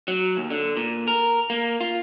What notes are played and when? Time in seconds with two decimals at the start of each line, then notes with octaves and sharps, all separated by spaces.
0.08 F#3
0.37 D#2
0.50 D3
0.77 A#2
1.07 A#4
1.50 A#3
1.81 F4